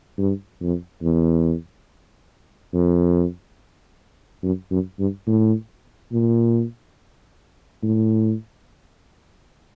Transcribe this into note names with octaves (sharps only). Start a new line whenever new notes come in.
G2
F2
E2
F2
F#2
F#2
G2
A2
A#2
A2